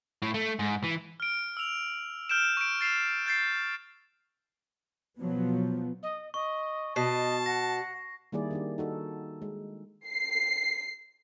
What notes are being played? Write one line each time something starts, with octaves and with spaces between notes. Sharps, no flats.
A2
A3
G#2
E3
F6 D7
E6 F7
F6 G6 D7 E7
C#6 D7
A6 C7 E7 F7
G6 A6 C7
B2 F3 F#3 B3
D#5
D#5 C#6
B2 D#5 A5 C7
F#5 A#6
D#3 G3 A#3 E4 G#4 D5
D#3 D4 G4
D#4 F#4 A4
G#3
C7